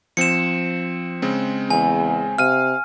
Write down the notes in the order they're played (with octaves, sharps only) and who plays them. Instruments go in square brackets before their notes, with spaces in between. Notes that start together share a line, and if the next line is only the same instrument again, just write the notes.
[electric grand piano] F3 C4 [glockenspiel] C#7 E7
[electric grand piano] C#3 G#3 C4
[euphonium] E2 [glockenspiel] G#5
[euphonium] C3 [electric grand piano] F5 D#7 [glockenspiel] F6